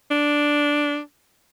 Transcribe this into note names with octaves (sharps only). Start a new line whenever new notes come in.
D4